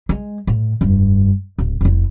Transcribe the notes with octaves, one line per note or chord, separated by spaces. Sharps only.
G#3
A2
F1 G2
D1
F1 E4